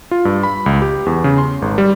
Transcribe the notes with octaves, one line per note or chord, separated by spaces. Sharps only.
F4
G2
B5
C#2
G4
E2
C#3
C6
G#1
G3